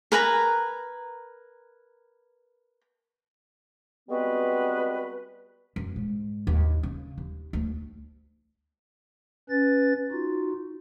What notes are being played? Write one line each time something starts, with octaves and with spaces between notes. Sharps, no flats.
A#4 B4 G#5 A#5
G3 G#3 B3 C4 F#4 B4
F#2
G#2
D#2
C#3
D#2
D2
C#4 B4 A6
D#4 F4 F#4